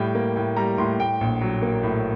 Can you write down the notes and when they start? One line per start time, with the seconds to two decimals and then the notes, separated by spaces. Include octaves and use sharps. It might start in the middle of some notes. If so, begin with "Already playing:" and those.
Already playing: A2 G3 G5
0.15 A#3
0.36 A2 G5
0.57 G3 A#5
0.78 A2 C6
0.99 A2 G5
1.21 A#1
1.41 F#3
1.62 A#3
1.83 A2